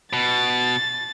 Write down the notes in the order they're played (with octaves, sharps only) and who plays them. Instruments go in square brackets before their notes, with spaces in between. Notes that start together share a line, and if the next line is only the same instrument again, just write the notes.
[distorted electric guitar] B2 [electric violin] A6